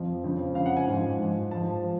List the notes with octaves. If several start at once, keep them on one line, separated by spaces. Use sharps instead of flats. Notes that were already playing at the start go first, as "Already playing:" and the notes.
Already playing: F2 F3
F2 C#3 F3
F2 C#3 F3 F5
F#5
G#5
G#2 F3
G#2 F3
G#2 F3 A5
F3